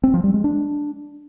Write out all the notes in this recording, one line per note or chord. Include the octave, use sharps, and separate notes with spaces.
C4
F3
G3
G#3
D4